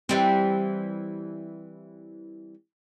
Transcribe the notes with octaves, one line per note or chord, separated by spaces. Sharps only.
E3 G3 C4